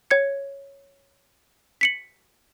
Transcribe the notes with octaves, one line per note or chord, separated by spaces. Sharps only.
C#5 G#6 C#7
B6 C#7 F#7